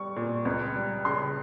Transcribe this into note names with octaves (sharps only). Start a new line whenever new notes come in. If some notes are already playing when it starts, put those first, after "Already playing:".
Already playing: G3 C#6
A#2
C#2
G3
C#3 C6